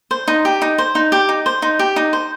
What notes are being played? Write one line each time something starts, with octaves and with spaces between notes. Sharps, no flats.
C5
D#4
G4
D#4
C5
D#4
G4
D#4
C5
D#4
G4
D#4
C5